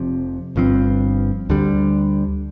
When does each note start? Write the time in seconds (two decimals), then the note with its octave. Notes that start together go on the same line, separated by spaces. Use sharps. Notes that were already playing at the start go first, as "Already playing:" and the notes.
Already playing: F1 F2 C3
0.56 G1 G2 F3 C4
1.49 D2 D3 G3